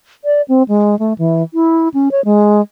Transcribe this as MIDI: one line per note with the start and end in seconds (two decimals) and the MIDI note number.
0.24 0.42 74
0.48 0.63 60
0.68 0.98 56
0.99 1.13 57
1.18 1.43 52
1.54 1.89 64
1.94 2.09 61
2.12 2.24 73
2.25 2.61 56